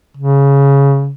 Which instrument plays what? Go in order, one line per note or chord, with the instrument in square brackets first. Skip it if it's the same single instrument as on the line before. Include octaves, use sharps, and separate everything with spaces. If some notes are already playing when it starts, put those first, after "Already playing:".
[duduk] C#3